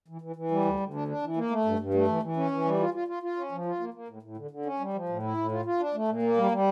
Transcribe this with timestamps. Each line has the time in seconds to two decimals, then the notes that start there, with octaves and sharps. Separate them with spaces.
0.08 E3
0.22 E3
0.36 E3
0.51 G3
0.65 D2
0.80 D2
0.94 D4
1.08 D4
1.22 E3
1.37 A#3
1.51 A3
1.65 G2
1.79 G2
1.94 A3
2.08 E3
2.23 E3
2.37 C#4
2.51 E3
2.65 G3
2.80 F4
2.94 F4
3.08 F4
3.23 F4
3.37 C#4
3.52 F3
3.65 F4
3.80 A#3
3.94 A#3
4.08 A2
4.23 A2
4.37 D3
4.51 D3
4.66 C#4
4.80 G3
4.93 F3
5.09 A2
5.23 E4
5.37 A2
5.52 F4
5.65 F4
5.80 D4
5.94 A3
6.08 A#2
6.22 A#3
6.37 G3
6.51 G3